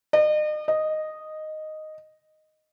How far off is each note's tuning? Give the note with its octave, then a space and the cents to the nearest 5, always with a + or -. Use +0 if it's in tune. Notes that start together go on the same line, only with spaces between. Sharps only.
D#5 -40
D#5 -5